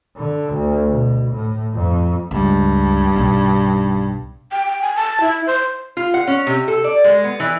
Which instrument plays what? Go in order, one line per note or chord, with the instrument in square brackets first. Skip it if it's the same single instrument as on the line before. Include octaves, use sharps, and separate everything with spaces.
[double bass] D3
D2
B2
A2
F2
[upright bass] C#2 [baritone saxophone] G2
[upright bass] B1 D#4
[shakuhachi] G5
G5
G#5
A5
E4
C5
[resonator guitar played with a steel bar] F4
F#5
C#4
C3
A4
D5
G#3
B3
E3